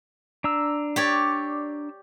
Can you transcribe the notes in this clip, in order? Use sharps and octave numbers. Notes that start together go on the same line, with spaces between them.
D4 A#5 E6
G4 C#5 D5